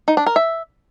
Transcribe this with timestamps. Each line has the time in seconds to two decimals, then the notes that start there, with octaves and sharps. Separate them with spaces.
0.08 D#4
0.17 D4
0.26 A#4
0.36 E5